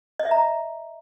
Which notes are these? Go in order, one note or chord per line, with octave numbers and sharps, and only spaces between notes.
D#5
E5
A#5